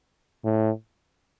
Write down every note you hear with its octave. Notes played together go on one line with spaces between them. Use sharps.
A2